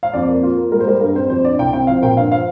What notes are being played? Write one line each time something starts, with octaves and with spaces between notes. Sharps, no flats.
F5
F2 D5
A#3
F4
A#3
G3 A#4
C5
G3 A#4
G2 A#4
C4 C5
F2 C5
D4 D5
C2 G5
C3 G5
F3 F5
A#2 G5
G2 F5
F3 F5